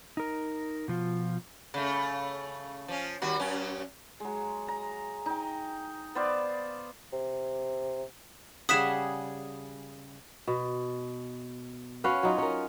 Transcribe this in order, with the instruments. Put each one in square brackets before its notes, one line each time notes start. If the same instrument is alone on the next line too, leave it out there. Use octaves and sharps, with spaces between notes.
[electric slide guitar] D#4 A#4
B2 F3 F4
[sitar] C#3 A3
F3 C#4
D#2 G3 F#4
F#2 C#4
[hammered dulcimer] F#3 G#3
A#5
D#4 G5
B3 C5 D5 F5
[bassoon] C3
[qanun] C#3 G3 G#4 [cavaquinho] F#5 [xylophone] D#6 B6 E7
[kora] B2
C#4 F#4 B4 F5
F#3 D#4 F4
C#4 A#4